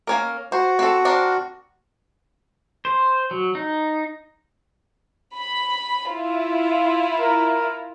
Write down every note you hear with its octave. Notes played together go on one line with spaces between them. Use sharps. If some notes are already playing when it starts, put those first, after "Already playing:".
A#3 C#4 A#4
F#4 C5
C4 A4
C4 D4 A#4
C5
F#3
D#4
B5
E4 F4
A#4